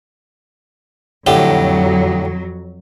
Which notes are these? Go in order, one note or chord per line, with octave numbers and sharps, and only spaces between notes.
F2 A2 D3 F#3 G4